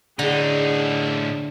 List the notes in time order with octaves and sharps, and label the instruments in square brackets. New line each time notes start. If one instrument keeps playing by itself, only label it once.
[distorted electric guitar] A2 D#4 [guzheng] D3 [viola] G#4